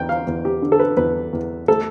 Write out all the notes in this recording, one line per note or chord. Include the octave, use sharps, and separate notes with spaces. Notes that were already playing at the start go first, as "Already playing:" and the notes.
Already playing: E2 G5
F5
E2
G4
D3
A4
B4
E2 B4
E2
A3 A4